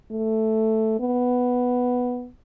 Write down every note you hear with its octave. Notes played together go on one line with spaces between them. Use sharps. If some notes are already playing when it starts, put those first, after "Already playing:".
A3
B3